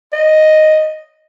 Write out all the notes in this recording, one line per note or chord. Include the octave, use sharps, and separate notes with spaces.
D#5